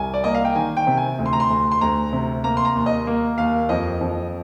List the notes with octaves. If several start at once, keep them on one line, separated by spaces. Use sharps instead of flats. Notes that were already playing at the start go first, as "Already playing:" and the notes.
Already playing: C2 G#5
D5
A#3 D#5
F5
G5
D#3 G#5
G5
C3
G#5
D2
C6
A#5
C6
D2
C6
D2 A#5
C3
A#3 A#5
C6
A#5
D#2
D#5
A#3
D#2 F5
F2 D#5
F2